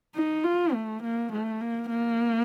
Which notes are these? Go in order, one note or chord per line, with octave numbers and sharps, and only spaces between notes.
D#4
F4
A3
A#3
A3
A#3
A#3